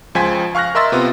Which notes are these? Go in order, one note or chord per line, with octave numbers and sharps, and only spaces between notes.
C#2 F3 C5 G#5 G#6 B6
F5 C#6 F6 F#6 A#6
A#4 D#5 E5 C6 E6 A6
C3 B3 F4 B4